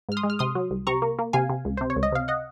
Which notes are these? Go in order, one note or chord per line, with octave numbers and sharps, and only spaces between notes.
G#2 F6
C6 D#6
G#3
F6
C3 C6 D#6
F#3
C2
C3 A#5 C#6
A#3
A#3
C3 F5 G#5
C3
C#2
C3 C5
C#5
C#2
D#5
C3 F5
D#5 F#5